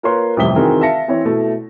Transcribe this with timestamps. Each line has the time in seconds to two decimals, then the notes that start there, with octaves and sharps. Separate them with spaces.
0.03 A#3 F4 A#4 B4 C#5 C6
0.37 A1 F2 C3 G3 B6 G7
0.56 D#3 E3 C4 F#4 G#4 A#4
0.81 E5 F5 A5 A#6 C#7
1.08 E3 C4 E4 C#5
1.25 B2 A3 E4